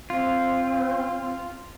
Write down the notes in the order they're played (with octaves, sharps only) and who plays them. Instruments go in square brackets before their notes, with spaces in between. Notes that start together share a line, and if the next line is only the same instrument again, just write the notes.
[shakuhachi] C4 [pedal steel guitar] F4